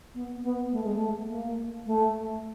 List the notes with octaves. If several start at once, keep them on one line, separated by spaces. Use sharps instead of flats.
B3
B3
A3
G#3
A3
A#3
A3